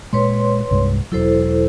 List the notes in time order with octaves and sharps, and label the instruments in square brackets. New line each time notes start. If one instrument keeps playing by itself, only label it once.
[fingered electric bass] A#2 G#3 [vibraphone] B4 C#5 C6
[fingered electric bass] C2 G2 G#3
[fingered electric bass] E1 F#3 [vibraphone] E4 A4 C5